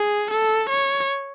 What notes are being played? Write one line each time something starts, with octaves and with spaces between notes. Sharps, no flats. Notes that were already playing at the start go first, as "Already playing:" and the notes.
Already playing: G#4
A4
C#5